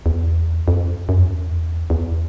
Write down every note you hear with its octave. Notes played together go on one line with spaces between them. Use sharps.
E2
F2
F#2
F2
E2
E2